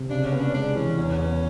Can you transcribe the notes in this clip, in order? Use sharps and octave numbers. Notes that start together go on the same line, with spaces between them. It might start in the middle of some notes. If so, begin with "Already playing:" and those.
Already playing: C3
C#3 D4
C#4
B3
D4
G#3 D4
E3 C#4
E2 C#4
B3